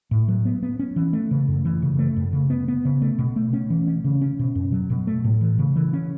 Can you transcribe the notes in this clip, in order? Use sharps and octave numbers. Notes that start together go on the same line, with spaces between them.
A2
F#3
B3
B3
C#4
E3
A3
C#3
F#2
E3
C#3
A3
F#2
C#3
B3
B3
C#3
A3
B2
A3
C#4
E3
C#4
C#3
C#4
B2
F#2
F#3
B2
A3
A2
E3
C#3
E3
C#4